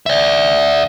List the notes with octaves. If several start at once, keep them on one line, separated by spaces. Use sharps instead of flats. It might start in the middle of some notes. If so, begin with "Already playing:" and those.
D5 E5